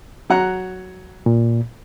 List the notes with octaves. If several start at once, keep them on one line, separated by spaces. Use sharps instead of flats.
F#3 F#5 A#5
A#2